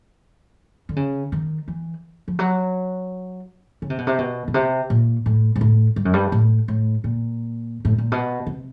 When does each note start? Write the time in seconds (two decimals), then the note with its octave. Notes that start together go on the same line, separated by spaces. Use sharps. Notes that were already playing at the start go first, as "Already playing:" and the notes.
0.89 D3
0.96 C#3
1.32 D#3
1.68 E3
2.28 F3
2.39 F#3
3.82 C#3
3.90 C3
3.98 B2
4.07 C3
4.18 B2
4.48 B2
4.54 C3
4.90 A#2
5.26 A2
5.56 G#2
5.61 A2
5.96 G2
6.05 F#2
6.13 G2
6.32 A2
6.68 A2
7.04 A#2
7.85 A2
7.98 A#2
8.12 B2
8.47 C3